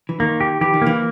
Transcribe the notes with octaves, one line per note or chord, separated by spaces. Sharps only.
E3
D#3 A#3
G4
E3 G4
D#3
A#3
E3